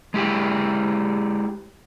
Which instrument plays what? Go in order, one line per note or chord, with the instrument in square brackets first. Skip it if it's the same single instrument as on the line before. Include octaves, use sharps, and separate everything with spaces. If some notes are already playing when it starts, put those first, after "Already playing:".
[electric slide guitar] G#3 E4 G4 G#4